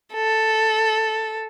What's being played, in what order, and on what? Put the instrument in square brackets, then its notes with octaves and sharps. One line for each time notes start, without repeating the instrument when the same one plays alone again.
[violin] A4